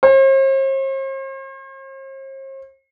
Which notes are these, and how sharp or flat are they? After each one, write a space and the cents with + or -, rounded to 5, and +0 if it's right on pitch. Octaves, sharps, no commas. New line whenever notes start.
C5 +45